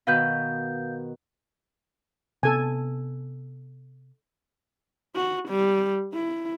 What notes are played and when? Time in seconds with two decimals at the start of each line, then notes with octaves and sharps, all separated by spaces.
0.07 B2 D#3 B4 F5 G6
2.43 C3 B3 A4 G#5
5.16 F#4
5.49 G3
6.13 E4